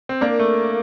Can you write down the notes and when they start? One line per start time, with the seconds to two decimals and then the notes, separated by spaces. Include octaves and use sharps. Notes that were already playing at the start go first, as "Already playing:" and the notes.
0.09 C4
0.21 A#3 D4 A#4 D5 F5
0.39 A3